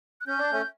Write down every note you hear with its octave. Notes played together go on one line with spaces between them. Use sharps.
F#6
C#4 G6
D4
A3 C#4